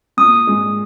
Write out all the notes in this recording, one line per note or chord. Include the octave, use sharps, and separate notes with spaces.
A#2 D#6
G#3